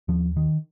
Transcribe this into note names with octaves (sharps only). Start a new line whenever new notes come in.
D#2 F3
D#3